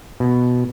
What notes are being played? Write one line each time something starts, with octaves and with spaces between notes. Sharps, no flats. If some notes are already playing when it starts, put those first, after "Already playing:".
B2